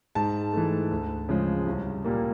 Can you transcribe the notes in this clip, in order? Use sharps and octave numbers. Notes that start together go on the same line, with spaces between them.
G#2 A5
E3 A3
D2
C#3 F3 G#3
C2
A#2 G3 A#3